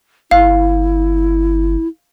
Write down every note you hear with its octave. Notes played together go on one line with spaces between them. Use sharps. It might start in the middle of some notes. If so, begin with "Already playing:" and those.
G1 E4 F5